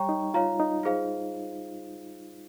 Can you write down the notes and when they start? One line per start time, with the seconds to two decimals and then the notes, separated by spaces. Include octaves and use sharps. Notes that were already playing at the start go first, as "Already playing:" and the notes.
Already playing: G3 C#5 G5 A#5 C#6
0.09 D#4
0.34 F4 C#5 F5 A#5
0.60 D#4
0.83 F4 G#4 C5 F5